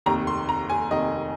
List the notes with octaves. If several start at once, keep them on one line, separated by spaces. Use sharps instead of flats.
F1 D#2 D#3 A#5
C6
A#5
G#5
F1 D#2 D#3 D#5